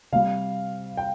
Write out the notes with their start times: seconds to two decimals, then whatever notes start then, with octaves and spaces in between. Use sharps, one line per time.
0.12 C3 G3 F5
0.97 G5